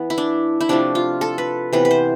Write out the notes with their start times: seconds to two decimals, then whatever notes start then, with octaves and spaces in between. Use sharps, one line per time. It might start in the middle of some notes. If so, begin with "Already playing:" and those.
Already playing: E3 B3
0.10 E4
0.18 D4
0.61 E4
0.69 C3 F3 A3 D4
0.95 F4
1.21 A4
1.38 B4
1.73 C3 E3 B3 B4
1.85 B4
1.91 C5